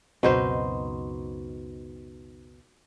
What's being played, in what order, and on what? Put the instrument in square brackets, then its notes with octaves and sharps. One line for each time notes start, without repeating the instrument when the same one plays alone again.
[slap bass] C#2 F#2 C4 [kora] B2 D#4 C5